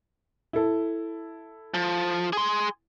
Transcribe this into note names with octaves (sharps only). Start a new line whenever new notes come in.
E4 A4
F3
G#4 C6